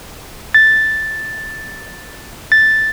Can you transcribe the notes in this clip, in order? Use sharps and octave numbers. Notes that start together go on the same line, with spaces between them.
A6
A6